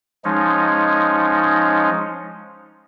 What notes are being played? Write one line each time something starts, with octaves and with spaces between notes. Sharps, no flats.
F3 G#3 C#4 D#4